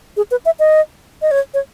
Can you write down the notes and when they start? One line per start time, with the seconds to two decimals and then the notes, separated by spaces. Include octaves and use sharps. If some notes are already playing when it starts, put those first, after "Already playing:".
0.17 G#4
0.31 B4
0.45 E5
0.59 D#5
1.22 D#5
1.31 C#5
1.54 C#5